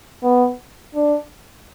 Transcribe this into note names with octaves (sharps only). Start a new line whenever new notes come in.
B3
D4